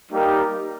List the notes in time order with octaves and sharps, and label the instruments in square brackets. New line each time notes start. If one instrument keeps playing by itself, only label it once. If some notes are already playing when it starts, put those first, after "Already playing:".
[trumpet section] G3 A#3 D#4 G4 A#4